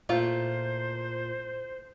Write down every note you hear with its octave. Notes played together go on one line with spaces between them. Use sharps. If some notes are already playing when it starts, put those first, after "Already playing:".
A#2 A3 E4 F4 C5